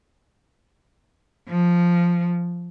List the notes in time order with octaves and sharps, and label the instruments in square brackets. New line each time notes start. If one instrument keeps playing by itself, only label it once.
[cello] F3